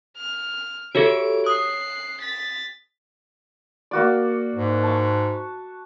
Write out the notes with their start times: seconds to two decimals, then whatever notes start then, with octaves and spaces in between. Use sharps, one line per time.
0.18 F6
0.95 F#4 G4 A4 C#5 E5 D7
1.46 D#6 F#6 C7
2.21 A6 B6
3.91 A#3 F#4 D5
4.55 G#2
4.83 A5 C#6